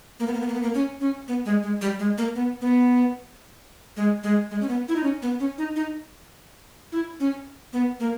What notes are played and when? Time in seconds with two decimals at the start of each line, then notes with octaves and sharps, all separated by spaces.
0.20 A#3
0.27 B3
0.34 A#3
0.41 B3
0.48 A#3
0.55 B3
0.62 A#3
0.74 C#4
1.01 C#4
1.28 B3
1.46 G#3
1.63 G#3
1.81 G3
1.99 G#3
2.18 A#3
2.35 B3
2.61 B3
3.97 G#3
4.23 G#3
4.51 G#3
4.61 C#4
4.69 B3
4.88 E4
4.96 D#4
5.04 C#4
5.22 B3
5.40 C#4
5.58 D#4
5.76 D#4
6.92 E4
7.20 C#4
7.73 B3
8.00 A#3